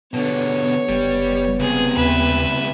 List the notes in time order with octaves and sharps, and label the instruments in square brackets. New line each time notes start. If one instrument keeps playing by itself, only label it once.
[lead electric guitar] B2 D3 [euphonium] B3 [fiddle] C#5
[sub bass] F#1 [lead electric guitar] G3
[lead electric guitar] C#2 C3 [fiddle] G#4
[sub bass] D#2 [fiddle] B4 E5